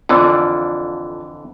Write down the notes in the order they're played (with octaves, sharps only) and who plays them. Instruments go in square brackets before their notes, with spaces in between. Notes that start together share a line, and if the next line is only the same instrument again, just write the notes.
[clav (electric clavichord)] F2 D3 E3 [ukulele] F4 D5